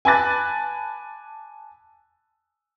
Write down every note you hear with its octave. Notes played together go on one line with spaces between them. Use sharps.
G#5 A5 B5 D6 F#6 A6